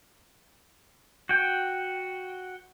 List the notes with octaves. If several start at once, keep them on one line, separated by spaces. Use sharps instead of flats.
F#4 G5